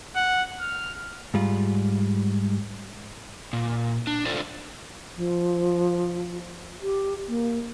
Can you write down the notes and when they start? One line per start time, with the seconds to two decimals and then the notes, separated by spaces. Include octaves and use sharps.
0.16 F#5
0.60 F6
1.34 G#2 G3 F4
3.53 A#2
4.07 D4
4.26 F4 A4 C5 D5
5.16 F3
6.82 G4
7.28 A#3